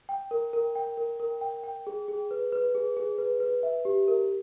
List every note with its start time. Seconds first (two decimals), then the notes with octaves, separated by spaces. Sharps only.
0.09 G5
0.31 A#4
0.53 A#4
0.75 G5
0.97 A#4
1.20 A#4
1.41 G5
1.64 G5
1.87 G#4
2.08 G#4
2.31 B4
2.52 B4
2.75 G#4
2.97 G#4
3.18 B4
3.40 B4
3.63 E5
3.85 G4
4.08 A#4